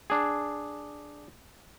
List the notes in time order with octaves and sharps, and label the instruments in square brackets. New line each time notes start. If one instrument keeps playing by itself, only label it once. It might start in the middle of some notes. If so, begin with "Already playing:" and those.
[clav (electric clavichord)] D4 G#4